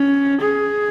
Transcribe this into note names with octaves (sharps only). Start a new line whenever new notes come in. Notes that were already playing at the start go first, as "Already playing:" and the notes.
Already playing: C#4
G#4